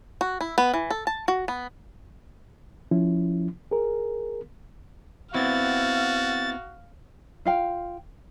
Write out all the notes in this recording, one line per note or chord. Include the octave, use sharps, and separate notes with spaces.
F#4
E4
B3
E3
A4
A5
F#4
B3
F3 C#4 E4
G#4 A#4
B3 C4 E4 F#4 F5 A6
F4 F5 G5